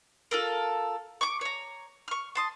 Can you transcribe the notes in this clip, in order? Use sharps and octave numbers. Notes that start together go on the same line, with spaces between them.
F4 A4 A#4
C#6 D6
C#5 A#5
C#6 F6
A5 C6 D#6